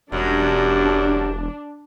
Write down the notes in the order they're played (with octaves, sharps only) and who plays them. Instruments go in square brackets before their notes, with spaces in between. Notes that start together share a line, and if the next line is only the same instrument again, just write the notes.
[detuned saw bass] E1 [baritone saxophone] F#2 [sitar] F#3 G3 [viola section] D4